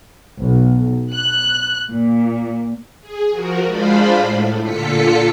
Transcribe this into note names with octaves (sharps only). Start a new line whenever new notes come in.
B1
F#6
A#2
G#4
F3 F#4 A#4
G#3 D4 F4 C5 F5 B5
A2
A#2 D3 F4 A4 B6 C#7